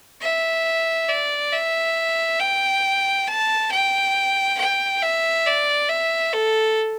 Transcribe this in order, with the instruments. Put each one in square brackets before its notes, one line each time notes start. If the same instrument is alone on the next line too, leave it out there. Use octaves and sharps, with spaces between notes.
[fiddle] E5
D5
E5
G5
A5
G5
G5
E5
D5
E5
A4